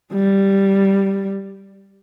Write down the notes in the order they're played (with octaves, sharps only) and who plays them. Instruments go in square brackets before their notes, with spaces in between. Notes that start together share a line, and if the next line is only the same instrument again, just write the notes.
[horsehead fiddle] G3